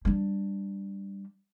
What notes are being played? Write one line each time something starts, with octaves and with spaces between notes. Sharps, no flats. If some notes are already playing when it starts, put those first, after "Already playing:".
G3 D4